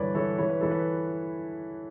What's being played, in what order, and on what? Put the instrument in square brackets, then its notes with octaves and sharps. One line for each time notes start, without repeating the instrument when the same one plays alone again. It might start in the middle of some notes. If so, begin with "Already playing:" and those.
Already playing: [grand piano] G2 D3 E3 B4 C#5 D5
E3 A4 C#5
E3 C#5
B4
E3 A4
B4